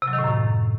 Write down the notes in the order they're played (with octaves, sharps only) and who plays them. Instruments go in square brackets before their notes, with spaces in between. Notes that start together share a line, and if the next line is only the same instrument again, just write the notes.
[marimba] C3
F#3
D#3
A2
F#2